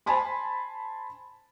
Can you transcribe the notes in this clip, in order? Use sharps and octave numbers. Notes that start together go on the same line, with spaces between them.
C5 G#5 A5 B5 C6